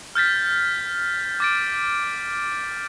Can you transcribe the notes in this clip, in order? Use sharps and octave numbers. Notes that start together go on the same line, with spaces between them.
F6 G6 A6 B6
D6 A6 D7